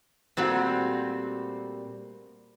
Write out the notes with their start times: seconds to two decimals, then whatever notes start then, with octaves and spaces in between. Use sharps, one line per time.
0.37 A#2 G3 A3 C4 F#4